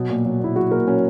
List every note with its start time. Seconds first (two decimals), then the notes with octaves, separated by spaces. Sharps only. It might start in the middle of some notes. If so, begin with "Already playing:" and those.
Already playing: B2 F#3
0.10 A#2
0.25 F#3
0.40 A#2 E4
0.56 F#3 F#4
0.71 A#2 A#4
0.87 F#3 C#4